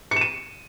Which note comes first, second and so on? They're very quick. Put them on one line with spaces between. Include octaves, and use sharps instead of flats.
C#7 E7 D#7